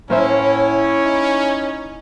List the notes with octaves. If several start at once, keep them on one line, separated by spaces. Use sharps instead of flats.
A2 A#3 C#4 E4 C5 C#5 E5
D#4